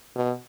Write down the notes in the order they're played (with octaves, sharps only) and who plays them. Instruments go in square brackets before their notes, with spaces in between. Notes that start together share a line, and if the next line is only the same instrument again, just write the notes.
[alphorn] B2